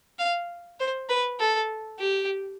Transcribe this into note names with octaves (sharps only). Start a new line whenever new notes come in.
F5
C5
B4
A4
G4